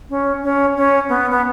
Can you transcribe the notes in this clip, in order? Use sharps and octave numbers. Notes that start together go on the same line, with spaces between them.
C#4
C#4
C#4
B3
B3